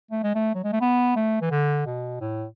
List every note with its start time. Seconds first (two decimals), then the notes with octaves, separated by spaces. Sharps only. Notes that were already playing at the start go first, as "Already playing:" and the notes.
0.11 A3
0.23 G#3
0.35 A3
0.55 F#3
0.64 G#3
0.73 A3
0.81 B3
1.16 A3
1.42 E3
1.51 D3
1.86 B2
2.21 A2